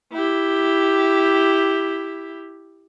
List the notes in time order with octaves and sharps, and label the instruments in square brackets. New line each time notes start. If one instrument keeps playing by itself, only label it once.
[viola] E4 G4